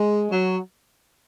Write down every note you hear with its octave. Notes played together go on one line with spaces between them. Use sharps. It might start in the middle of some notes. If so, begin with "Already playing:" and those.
Already playing: G#3
F#3